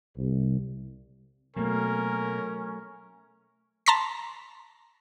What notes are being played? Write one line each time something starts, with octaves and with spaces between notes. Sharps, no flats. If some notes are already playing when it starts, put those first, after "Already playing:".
C2
B2 F#3 A3 A#3 C#4 A#4
A5 A#5 C6 A#6 B6